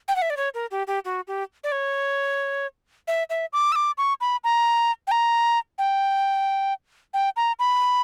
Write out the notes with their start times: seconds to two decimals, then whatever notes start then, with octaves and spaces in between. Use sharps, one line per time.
0.08 G5
0.16 F#5
0.22 E5
0.30 D5
0.37 C#5
0.54 A#4
0.71 G4
0.87 G4
1.05 F#4
1.27 G4
1.64 D5
1.72 C#5
3.08 E5
3.30 E5
3.53 D6
3.72 E6
3.75 D6
3.98 C#6
4.21 B5
4.44 A#5
5.07 G5
5.11 A#5
5.78 G5
7.14 G5
7.36 A#5
7.59 B5